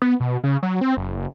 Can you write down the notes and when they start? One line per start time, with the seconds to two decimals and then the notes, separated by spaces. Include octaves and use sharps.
0.02 B3
0.20 B2
0.44 C#3
0.63 F#3
0.81 C4
0.97 F#1